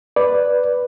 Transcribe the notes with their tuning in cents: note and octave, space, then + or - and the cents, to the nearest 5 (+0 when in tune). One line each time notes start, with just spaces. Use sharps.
B4 +0 D5 +0